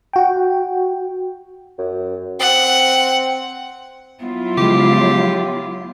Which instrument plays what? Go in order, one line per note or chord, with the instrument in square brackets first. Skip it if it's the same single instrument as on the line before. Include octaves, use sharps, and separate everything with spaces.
[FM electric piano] F#4 G5
[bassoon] F#2
[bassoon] C4 [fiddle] F#5
[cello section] F#3 E4 F4 [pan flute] B3
[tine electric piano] C#3 F3 G#3 [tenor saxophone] G4
[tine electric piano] C#5